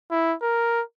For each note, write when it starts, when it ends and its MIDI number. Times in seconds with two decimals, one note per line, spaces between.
0.11 0.34 64
0.42 0.82 70